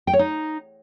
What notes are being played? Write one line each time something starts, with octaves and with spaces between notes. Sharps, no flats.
G5
C#5
D#4